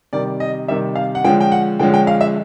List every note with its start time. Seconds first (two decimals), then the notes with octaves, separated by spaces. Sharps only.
0.13 C3 D#3 G3 D5
0.40 D#5
0.68 C3 D#3 G3 E5
0.96 F5
1.15 F#5
1.24 D3 F3 G#3 C#4 G5
1.41 G5
1.52 F#5
1.79 D3 F3 G#3 C#4 G5
1.94 G5
2.07 F5
2.21 E5